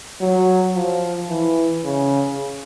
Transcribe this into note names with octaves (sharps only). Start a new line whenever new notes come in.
F#3
F3
E3
C#3